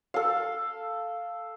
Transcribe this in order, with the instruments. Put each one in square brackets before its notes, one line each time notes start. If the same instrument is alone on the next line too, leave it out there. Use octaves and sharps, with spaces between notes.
[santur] A4 F5